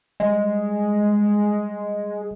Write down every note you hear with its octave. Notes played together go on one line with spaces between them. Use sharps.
G3 G#3 D#5